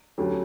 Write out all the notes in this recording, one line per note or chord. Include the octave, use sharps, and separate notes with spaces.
D2 D3 F#3 C#4 G4